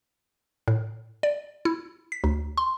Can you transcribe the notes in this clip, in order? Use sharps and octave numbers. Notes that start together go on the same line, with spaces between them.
A2
D5
E4
B6
D2
C6